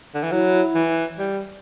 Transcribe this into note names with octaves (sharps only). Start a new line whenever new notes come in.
D3
E3
F#3 E4
E3
G3